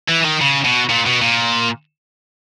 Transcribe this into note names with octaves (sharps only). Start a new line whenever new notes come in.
E3
D#3
C#3
B2
A#2
B2
A#2